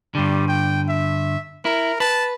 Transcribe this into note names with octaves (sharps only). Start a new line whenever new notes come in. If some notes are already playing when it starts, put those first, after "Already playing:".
G2 D3 G3
G5
E5
E4 A#4
B4 A5